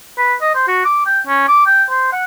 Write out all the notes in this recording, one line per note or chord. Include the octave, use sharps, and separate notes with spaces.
B4
D#5
C5
F#4
D6
G5
C#4
D6
G5
C5
F#5